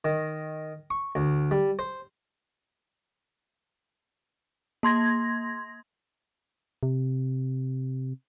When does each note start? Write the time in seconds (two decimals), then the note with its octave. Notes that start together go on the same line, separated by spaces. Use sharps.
0.05 D#3
0.91 C#6
1.15 D2
1.51 G3
1.79 C5
4.83 A#3 C6 G#6 A#6
6.83 C3